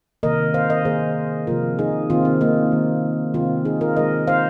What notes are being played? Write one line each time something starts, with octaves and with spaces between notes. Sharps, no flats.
C3 D#3 A#3 A#4 D#5
C5 F5
A#4 D#5
D#3 A#3 G#4 C5
C3 F3 A#3 F4 A#4
D#4 G#4
D#3 A#3 C4 F4
C4
A#3 D#4
D#3 G#3
C3 D#3 G#3 C4 F4
D#4 G#4
F4 A#4
D#3 G#3 A#4 D#5
C5 F5